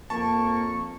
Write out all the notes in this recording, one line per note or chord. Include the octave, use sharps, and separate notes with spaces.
F2 A#3 A5 C#6